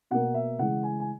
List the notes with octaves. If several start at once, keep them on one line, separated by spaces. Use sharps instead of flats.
B2 A#3 F#5
E5
C#3 E3 G#3 F#5
G#5
G#5